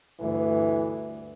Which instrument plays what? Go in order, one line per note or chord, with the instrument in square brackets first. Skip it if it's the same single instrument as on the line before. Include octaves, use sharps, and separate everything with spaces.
[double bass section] D2 G2 [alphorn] E3